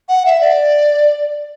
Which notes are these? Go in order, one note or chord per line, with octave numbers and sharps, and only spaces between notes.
F#5
E5
D5